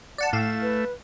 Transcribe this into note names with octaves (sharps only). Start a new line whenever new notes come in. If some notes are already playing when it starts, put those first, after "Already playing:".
D5 F#5 A5
A2 A3 F5 E7
B4